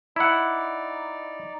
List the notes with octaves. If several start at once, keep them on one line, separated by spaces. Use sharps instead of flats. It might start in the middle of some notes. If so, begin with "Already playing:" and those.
D#4 E4 D5 F#5